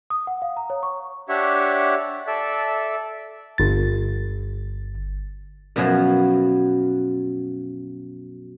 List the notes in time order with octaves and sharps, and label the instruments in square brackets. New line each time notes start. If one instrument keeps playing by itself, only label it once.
[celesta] D#6
F#5
F5
A#5
C#5
C#6
[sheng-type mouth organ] D4 G4 C#5 E5 F#5
A4 D5 E5
[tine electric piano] G1 A6
[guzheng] F#2 B2 F3 F#3